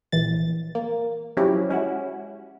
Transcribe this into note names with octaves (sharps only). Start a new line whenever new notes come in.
A#1 E3 A6
A#3
F3 F#3 C#4 E4 G4
G#3 C#4 E4 F#4